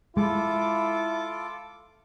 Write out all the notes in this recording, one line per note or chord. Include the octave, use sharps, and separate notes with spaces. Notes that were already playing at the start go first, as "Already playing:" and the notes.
G#3 E4 F4 A4 D6